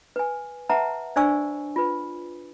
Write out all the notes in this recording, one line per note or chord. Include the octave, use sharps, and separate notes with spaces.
B4 G#5
B4 E5 F#5 A5 A#5
D4 C5 D5 G#5 C#6 E6
F4 B4